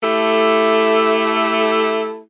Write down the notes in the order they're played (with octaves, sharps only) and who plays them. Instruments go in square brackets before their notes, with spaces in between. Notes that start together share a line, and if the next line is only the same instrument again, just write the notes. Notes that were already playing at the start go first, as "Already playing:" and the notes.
[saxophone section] A3 E4 G4 A4